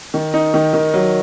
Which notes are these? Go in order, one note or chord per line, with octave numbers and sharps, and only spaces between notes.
D#3
D#4
D#3
D#3
F#3